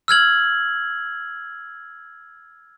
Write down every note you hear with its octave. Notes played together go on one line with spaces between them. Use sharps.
E6 F6 G#6 F#7